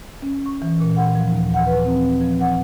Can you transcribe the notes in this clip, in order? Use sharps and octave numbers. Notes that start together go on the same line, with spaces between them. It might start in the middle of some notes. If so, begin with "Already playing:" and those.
C#4
C#6
E3
A#2
F#5
F3
D#2
F#5
B4
C4
F3
F#5